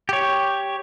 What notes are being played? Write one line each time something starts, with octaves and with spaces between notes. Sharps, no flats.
G4 C#5